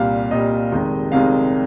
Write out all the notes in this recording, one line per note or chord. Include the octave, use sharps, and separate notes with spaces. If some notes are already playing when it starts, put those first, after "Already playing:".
Already playing: C2 A#2 G3 F5
C2 A#2 G3 D#5
F1 F2 C3 D#3 G#3
F1 F2 C3 D#3 G#3 F5